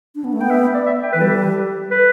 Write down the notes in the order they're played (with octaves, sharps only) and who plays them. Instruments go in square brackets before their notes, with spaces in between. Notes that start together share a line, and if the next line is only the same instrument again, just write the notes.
[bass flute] D4
B3
A3
[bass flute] B3 [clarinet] G5
[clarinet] E5
D5
E5
G5
[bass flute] E3 [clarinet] B4
[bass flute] G3 [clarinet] A4
[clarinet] B4